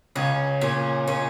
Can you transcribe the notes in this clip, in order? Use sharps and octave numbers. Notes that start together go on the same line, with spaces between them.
C#2 C#3 C#4
A#2 C#4
A#2 C#4